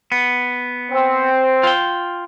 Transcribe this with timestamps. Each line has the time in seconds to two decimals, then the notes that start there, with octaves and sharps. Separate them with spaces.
0.12 B3
0.91 C4
1.63 F4 G5